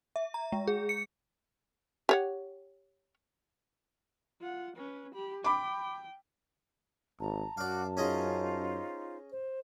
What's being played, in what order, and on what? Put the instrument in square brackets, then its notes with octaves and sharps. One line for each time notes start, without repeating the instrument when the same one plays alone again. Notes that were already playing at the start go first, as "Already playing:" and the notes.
[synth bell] E5
A#5
G#3
G#4
C#7
[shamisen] G4 C#5 F#5
[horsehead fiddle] F4 F#5
C#4 B4
G4 B5
[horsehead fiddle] G5 [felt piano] B5 D6
[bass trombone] G#1 [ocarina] A5 [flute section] A#5
[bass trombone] F#2 [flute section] F#4 D6 F#6 [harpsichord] D5 F5
[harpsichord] C#4 G#4 D#5 [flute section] D#4 F4 C5
[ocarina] C5